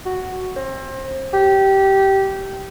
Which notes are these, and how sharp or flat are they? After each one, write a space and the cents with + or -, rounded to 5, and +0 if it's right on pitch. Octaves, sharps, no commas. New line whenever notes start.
F#4 +0
C4 +30
G4 -15